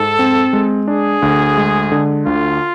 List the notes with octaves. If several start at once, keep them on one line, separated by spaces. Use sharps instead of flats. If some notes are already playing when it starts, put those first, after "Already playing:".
Already playing: G#2 A4
C4
G#3
D4 G#4
D2
G#3
D3
D2 F4